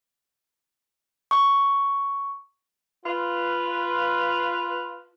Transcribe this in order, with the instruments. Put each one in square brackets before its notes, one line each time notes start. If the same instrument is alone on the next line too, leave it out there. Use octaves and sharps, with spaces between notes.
[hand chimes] C#6
[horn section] F4 B4